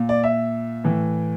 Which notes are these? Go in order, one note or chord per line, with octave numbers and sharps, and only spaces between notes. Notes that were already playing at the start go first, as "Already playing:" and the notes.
Already playing: A#2
D5
E5
A2 E3